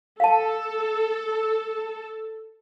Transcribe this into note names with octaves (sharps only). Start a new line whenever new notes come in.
A4 F5 A5